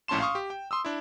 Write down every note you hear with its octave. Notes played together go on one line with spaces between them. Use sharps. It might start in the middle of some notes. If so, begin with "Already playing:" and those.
A#1 A2 C#4 A5 C6 E7
F5 C6 C#6 D#6
G4
G5
C6 D#6 E6
D4 E4